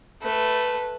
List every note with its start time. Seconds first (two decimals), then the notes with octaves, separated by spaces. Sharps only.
0.22 A3 B4